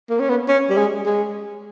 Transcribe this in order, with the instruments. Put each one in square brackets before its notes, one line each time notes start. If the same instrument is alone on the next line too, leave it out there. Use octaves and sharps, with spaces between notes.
[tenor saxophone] A#3
C#4
B3
C#4
G3
G#3
G#3